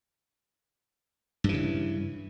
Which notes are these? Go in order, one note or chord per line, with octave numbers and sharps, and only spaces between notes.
G2 C#3 E3